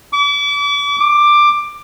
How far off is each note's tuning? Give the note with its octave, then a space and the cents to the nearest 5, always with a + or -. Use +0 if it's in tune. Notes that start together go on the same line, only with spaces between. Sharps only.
D6 -40
D6 +10